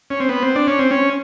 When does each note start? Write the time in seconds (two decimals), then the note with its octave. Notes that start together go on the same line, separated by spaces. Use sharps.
0.10 C#4
0.20 C4
0.29 B3
0.42 C4
0.55 D4
0.67 C#4
0.79 C4
0.91 C#4